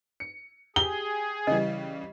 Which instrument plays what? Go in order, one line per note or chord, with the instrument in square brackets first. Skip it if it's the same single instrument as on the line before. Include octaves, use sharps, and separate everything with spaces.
[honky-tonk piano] C#7
[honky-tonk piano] G4 [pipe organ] G#4 [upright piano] G7
[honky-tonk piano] C#3 E3 G3 [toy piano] D#5